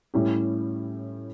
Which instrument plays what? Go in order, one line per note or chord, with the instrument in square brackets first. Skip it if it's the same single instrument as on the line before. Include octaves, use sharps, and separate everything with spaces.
[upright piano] A2 G3 C#4 E4 G4